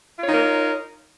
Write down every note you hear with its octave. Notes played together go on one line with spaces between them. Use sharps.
D#4 F4 A#4 C#5